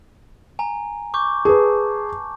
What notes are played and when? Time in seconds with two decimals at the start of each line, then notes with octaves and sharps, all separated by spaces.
0.59 G#5 A#5
1.14 C#6 D6 G6
1.45 G#4 B4 A5